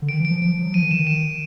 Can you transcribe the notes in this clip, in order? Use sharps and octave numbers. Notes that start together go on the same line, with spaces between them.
D3
D#3 D7
E3
D7
F3
F3 D7
F3
F#3
F3 D#7
D#3
E3 E7
D#3
E7